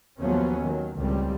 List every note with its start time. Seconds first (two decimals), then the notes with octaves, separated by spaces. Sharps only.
0.20 D#2 F3 F#3 A3 B3 C#4
0.62 D#3 F#3
0.97 C#2 A2 D#3 G3 C4